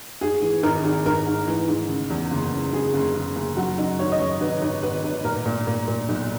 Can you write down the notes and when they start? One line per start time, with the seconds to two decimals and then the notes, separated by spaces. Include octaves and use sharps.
0.21 G#2 G#4
0.42 E3
0.63 G#1 A#4
0.84 G#1
1.05 G#1 A#4
1.26 G#2
1.48 E3
1.68 G#2
1.89 C#3
2.10 E2
2.31 F#1
2.52 C#3
2.73 C#3 G#4
2.94 F#1
3.15 F#1
3.36 F#1
3.57 F#2 F#4
3.78 F#2 D#4
3.99 G#1 C#5
4.12 D#5
4.20 F#2 C#5
4.41 G#1 B4
4.62 G#1
4.83 G#1 B4
5.04 G#1
5.24 A#2 A#4
5.46 A#2
5.67 A#2
5.88 A#2
6.09 B1